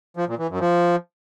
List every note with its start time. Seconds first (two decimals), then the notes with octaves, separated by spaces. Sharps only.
0.17 F3
0.28 A#2
0.39 E3
0.50 F#2
0.60 F3